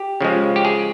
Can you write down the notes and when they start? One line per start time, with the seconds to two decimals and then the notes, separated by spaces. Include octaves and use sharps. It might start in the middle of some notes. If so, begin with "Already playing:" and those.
Already playing: G4
0.21 C#3 F3 G#3
0.56 G4
0.65 G#4